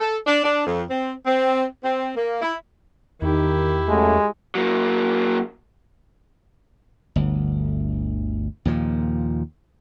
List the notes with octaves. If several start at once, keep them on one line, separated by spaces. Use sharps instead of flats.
A4
D4
D4
F2
C4
C4
C4
A#3
E4
E2 D#3 E4 G4
F#2 G#3 A3
F#3 A#3
G1 D2
D#2 A#2 F3